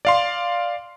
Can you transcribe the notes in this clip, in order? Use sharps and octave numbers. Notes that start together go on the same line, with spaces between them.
D5 F5 C6